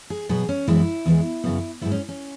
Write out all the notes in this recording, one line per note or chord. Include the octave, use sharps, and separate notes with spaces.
G#4
B2 F#3 B3 G#4
C#4
F#2 E3 G#3 B3 E4
E2 E3 G#3
F#2 C#3 F#3 B3
G#2 F#3 B3 E4
C#4
C#4